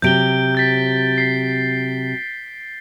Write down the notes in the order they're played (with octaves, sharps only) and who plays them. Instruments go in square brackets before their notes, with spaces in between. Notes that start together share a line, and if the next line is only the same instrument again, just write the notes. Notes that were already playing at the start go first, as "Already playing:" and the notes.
[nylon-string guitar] C3 F#3 [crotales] G6 D7 G7
[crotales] G6 A6 B6
B6 C7